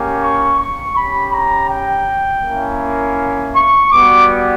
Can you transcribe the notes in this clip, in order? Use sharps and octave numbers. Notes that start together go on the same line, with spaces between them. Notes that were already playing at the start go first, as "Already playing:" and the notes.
Already playing: A#3 C#4 G4
C#6
C#6
C#4 G4 B5
A#5
G5
A#3 C#4 E4
C#6
G3 B3 F#4 D6